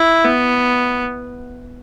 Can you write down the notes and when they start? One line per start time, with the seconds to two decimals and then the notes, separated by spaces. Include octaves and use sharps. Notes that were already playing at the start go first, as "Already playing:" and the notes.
Already playing: E4
0.25 B3